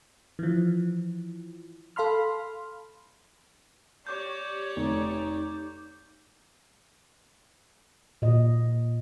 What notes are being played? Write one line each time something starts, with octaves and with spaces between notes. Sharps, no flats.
E3 F3
A4 F5 B5 C6 F6
G4 C#5 D5 D6 G6
F1 D#4
A#2 D#5